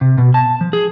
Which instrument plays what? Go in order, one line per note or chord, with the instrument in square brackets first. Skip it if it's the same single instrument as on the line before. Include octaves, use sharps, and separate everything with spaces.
[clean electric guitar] C3
B2
A5
F3
G#4